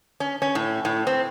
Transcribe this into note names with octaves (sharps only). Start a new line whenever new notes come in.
C#4
C#4
A2
A2
C4